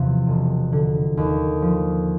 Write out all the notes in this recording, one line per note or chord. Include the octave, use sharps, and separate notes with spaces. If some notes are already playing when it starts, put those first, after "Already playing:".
Already playing: E2 C3 F3
E1
D3
D#2
F3